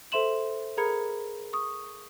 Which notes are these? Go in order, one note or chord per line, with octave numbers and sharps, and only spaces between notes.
A4 C5 E5 C6 E7 F#7
G#4 A#4 A#5 B5 G#6 C#7
C#6 D#6